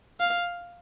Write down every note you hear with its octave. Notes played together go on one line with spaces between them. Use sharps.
F5